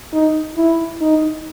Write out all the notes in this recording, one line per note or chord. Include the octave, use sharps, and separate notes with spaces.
D#4
E4
D#4